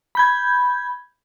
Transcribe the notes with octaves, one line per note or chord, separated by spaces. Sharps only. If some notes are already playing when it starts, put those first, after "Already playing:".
B5 G6 G#6